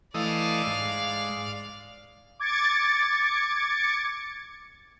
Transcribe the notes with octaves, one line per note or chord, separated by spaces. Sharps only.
E3 A3 D5 D#5 F5
G#2
D6 G#6 A6 C#7